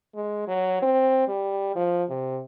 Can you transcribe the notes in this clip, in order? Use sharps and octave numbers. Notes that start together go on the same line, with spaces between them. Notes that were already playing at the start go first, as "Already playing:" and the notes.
G#3
F#3
C4
G3
F3
C3